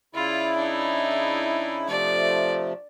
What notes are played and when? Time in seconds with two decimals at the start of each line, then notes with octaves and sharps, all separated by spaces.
0.15 C#3 E4 F4 D5
0.57 D4 D#4
1.88 C3 F3 A3 D5